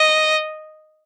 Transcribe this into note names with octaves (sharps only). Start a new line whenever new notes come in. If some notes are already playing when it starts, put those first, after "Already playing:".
Already playing: D#5